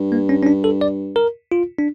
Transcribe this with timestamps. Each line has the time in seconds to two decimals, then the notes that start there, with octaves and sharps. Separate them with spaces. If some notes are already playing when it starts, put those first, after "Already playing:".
Already playing: G2
0.12 A#3
0.29 C#4
0.42 C#4
0.46 D4
0.64 A4
0.81 D5
1.16 A#4
1.52 F4
1.78 D4